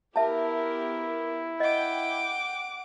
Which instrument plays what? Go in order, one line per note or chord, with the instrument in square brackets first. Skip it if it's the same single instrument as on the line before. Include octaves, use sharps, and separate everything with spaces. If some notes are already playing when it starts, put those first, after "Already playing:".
[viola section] B3 G4 A#4 [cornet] E4 [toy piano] E5 A5
[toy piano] D#5 [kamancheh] F#5 D6 [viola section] G5